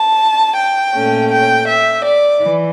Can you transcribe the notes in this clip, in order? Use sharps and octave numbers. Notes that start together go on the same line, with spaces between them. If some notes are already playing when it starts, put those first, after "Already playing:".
Already playing: A5
G5
A#2 A3 C#4
G5
E5
D5
E3